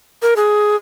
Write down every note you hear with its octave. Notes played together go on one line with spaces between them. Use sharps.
A#4
G#4